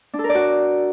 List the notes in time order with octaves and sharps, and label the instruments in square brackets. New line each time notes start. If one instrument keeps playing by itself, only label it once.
[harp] D4
A4
A#4
D5
F#4